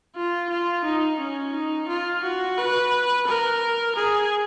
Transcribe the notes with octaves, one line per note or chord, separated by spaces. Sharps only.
F4
F4
D#4
C#4
D#4
F4
F#4
B4
A#4
G#4